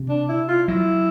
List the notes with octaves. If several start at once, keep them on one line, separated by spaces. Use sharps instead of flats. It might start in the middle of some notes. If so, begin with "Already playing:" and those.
Already playing: C3
D4
E4
F4
F#3 E4